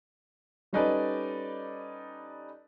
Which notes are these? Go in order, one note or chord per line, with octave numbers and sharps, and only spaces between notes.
G3 C#4 D#4 A4 B4 D5